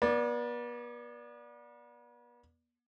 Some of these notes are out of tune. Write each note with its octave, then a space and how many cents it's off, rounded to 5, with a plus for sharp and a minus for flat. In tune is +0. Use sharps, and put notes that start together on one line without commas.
B3 -40 D5 +0